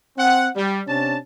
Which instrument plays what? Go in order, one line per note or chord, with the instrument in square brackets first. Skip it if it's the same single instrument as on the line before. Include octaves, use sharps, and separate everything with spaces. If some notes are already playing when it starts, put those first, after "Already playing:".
[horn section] C4 F#5
G3
C3 C#4 D4 A5